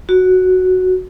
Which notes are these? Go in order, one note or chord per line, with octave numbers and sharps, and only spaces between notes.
F#4